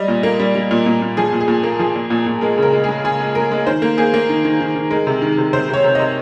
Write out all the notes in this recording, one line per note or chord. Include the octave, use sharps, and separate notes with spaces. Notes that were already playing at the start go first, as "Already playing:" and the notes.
Already playing: G3 D#5
A#2
A#3
G3
G3
A#2
A#2
A#2
F3 G#4
A#2
G#4
A#2
A#3
F3 G#4
A#2
A#2
A#2
G#3 A#4
C#3 A#4
G#3
G#4
G#3
C#3 G#4
G#3
G#3 A#4
G#3
D#3 C5
A#3
A#3 G#4
A#3
D#3
D#3
D#3
D#3
G#3 A#4
C3
D#3
C3
C3 C5
C3 C#5
C3
C3 D#5